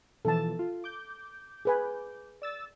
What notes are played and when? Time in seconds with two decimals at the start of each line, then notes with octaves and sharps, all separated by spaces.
0.25 B2 E3 F3 A4 A5
0.59 F4
0.84 D6 G6
1.65 G#4 B4 G#5
2.42 D5 E6 A6